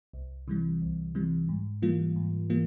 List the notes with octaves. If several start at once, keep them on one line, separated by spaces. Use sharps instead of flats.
C2
C3 E3 G3
C2
C3 E3 G3
G#2
E3 G3 A#3 F4
G#2
E3 G3 A#3 F4